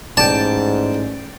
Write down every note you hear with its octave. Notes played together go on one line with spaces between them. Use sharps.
A1 G#2 D5 G5 A5